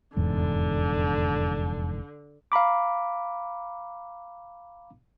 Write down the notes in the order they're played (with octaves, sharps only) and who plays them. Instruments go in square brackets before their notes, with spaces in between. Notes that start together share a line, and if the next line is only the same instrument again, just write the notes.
[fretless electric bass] F1 E2 G#2 [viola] D3
[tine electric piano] F5 A#5 B5 D6